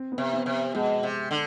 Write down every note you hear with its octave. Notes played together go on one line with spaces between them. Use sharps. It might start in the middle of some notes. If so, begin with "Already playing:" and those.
Already playing: C4
B3
C3
B3
C3
B2 G#3
C3
D3